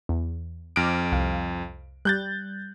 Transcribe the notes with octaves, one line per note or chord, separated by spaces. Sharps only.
E2
F2 D6 F6 A#6 D7
C2 F5
G3 F#6 G6 A6